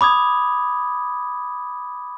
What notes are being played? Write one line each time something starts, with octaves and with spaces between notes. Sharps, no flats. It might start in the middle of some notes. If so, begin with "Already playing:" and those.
B5 D6 D#6 G#6